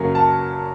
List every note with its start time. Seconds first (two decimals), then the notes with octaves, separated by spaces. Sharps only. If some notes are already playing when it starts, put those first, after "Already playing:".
Already playing: F#2 C#3 F#3 A#3 C#4
0.15 A5